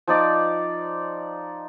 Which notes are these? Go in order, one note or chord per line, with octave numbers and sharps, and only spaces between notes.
F3 D#4 D5 D6